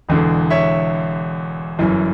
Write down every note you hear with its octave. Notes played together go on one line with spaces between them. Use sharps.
E1 E2 D3
C#5 E5
G1 F#2 E3